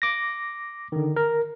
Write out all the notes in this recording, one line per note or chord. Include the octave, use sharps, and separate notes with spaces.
D6 A#6
D3 D#3
A#4